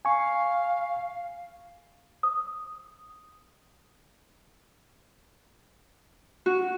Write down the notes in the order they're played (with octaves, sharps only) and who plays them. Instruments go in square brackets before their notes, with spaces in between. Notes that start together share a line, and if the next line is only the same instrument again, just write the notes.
[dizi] F5 [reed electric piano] G#5 C#6
[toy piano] D#6
[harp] F#4